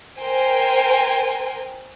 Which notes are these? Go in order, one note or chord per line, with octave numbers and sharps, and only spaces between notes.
A#4 C5 G5 G#5